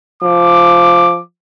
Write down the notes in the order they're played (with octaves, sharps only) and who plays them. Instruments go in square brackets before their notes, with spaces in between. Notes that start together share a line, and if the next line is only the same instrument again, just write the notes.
[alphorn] F3 [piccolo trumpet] D6